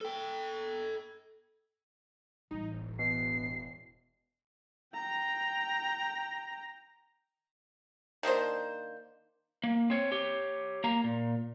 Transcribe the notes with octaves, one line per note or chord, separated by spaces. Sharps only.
A4 G5
A1 G3 D#4
E1
B2 C7
G5 A#5
D#3 A#3 D4 C5
A#3
C4 C#5
G4 C#5
A#3 A#5
A#2